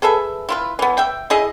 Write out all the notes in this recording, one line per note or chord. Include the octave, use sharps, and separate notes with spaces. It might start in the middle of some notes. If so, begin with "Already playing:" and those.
G#4 A4 B4 E5
E4 F4 B4
E3 B3
E5 G5
E4 G#4 D#5 E5